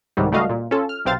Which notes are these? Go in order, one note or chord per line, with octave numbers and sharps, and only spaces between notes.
C2 G#2 D#3 F#3 G3
C#2 G3 A3 F#4 D#5 F5
A#2
C#4 F4 A4
F6
B1 C3 C4 C5 F5 A6